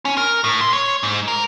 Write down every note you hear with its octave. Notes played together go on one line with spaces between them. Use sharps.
C#4
A#4
A2
C6
C#5
G#2
A#4